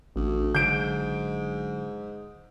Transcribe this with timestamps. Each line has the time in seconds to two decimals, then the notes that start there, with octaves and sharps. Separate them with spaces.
0.16 A1 D2
0.55 G#2 D3 F#3 G6 D7